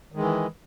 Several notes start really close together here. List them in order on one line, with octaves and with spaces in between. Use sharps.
D#3 G#3 E3